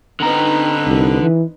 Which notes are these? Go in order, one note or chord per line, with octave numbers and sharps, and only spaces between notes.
D3 C4 D#4 B4 A#5
C2
E3